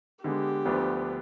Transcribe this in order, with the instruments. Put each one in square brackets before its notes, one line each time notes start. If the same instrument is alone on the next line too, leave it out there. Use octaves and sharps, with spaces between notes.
[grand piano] D3 G#3 B3 [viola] G4
[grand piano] D2 D3 F3 B3 D4